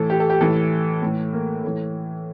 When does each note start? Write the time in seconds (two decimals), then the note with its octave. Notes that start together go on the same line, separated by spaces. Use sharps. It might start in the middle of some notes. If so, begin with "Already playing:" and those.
Already playing: A2 E3 A4
0.10 G4
0.20 A4
0.30 G4
0.41 A2 E3 A4
1.02 A2 E3
1.33 A#3
1.64 A2 E3